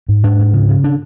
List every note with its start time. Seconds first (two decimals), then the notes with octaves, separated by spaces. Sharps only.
0.09 G#2
0.23 G#2 D4
0.39 G#2
0.54 C#3
0.69 C#3
0.84 D4